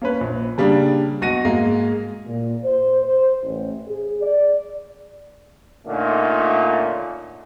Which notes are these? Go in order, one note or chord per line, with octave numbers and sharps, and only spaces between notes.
A#3 C#4 B4
A#1
C#3 G3 A#3 D4
B1 F#4 A#6 D#7
G#2 G#3 A#3
A#2
C5
C5
A1
G#4
D5
A#2 D3 A3 C#4 D#4 F4